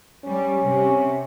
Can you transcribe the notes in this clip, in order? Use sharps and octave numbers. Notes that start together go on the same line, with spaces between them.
G3 C#4
C3